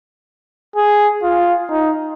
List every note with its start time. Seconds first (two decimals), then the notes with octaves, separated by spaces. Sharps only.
0.76 G#4
1.23 F4
1.70 D#4